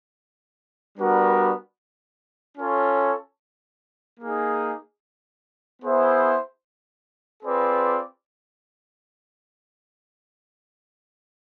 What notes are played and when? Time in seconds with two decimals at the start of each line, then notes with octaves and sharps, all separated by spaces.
0.96 G3 B3 D4 F#4 A#4
2.58 C#4 F4 A4 C#5
4.20 A#3 D#4 G#4
5.82 B3 E4 G#4 C5 E5
7.43 C4 F4 G#4 B4 D5